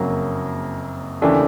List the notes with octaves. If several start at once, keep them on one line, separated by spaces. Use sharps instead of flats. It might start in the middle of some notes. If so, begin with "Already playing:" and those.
Already playing: F#1 F2 C#3 F#3 A#3
D#2 C#3 E3 A3 D4